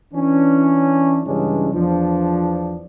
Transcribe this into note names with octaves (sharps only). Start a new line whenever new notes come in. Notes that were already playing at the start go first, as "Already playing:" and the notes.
E3 C#4 D4
G2 C#3 E3 G#3 C#4 D4
E2 F3 D4